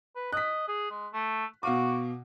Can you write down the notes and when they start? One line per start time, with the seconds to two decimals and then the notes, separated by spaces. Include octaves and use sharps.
0.16 B4
0.32 D#5 F#6 B6
0.68 G#4
0.91 G#3
1.13 A3
1.63 B2 F#4 F5 D6